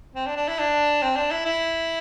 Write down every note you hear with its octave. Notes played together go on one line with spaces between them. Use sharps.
C4
D4
D4
E4
D4
C4
D4
E4
E4